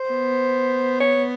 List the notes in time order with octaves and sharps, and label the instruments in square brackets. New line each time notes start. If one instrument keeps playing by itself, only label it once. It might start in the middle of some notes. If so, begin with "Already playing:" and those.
Already playing: [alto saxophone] C5
[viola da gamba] B3
[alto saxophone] C#5